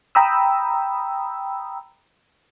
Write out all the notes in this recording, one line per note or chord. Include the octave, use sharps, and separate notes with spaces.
G5 A#5 B5 D#6 E6